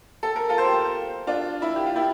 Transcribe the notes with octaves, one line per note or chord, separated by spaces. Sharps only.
A4
A#4
F4 A4
C5
G4 A#4
D4 F4
E4
G4
F4
E4 G4